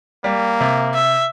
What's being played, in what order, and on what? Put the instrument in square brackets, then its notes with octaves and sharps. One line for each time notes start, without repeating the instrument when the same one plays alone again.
[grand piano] G3 [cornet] A#3
[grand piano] C3
[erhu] E5